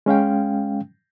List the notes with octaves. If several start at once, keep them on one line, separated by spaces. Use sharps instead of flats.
G#3 C#4 F5 G5